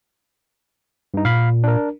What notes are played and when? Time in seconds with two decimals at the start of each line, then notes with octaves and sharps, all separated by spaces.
1.14 G2 D#4
1.25 A#2 F5 B5
1.64 D4 A#4